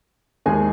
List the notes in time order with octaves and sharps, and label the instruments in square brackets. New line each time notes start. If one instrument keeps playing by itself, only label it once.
[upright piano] D#2 D#3 G#3 G#5